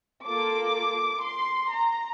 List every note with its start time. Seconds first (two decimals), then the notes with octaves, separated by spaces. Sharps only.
0.25 A#3 F4 A4 D6
1.24 C6
1.73 A#5